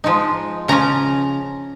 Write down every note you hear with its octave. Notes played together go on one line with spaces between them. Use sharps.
F3 G#3 D#4
C#3 F3 C#4 A#5